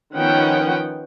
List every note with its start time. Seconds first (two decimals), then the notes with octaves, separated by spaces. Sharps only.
0.14 D#3 F3 B3 C#4 F#5 G5